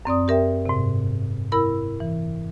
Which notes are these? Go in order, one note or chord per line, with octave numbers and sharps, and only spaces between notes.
F#2 C4 D5 D#6
G4 A#4 E5 G5
G#2 C3
E4 A#4 B5 E6
E3